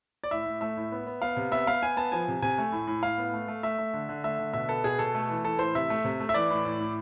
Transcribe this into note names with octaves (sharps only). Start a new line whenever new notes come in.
D5
A2 E5
A2
A3 E5
A2
B3
B3
B3 F5
C3
B3 E5
B3 F5
B3 G#5
B3 A5
F3 G#5
C3
C3 G#5
A3
A2
A2
A2 F5
B3
A3
A3
A3 E5
A3
D3
D3
A3 E5
D3
B2 E5
B3 A4
B2 G#4
B2 A4
A3
E3
E3 A4
A2 C5
C3 E5
A3
C3
A3
E5
E3 D5
A2
A2
A2